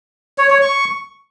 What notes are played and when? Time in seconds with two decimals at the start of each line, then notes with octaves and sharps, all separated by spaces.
0.38 C#5
0.50 C#5
0.62 C#6